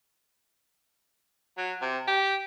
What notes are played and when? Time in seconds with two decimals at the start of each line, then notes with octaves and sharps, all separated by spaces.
1.58 F#3
1.82 C3
2.07 G4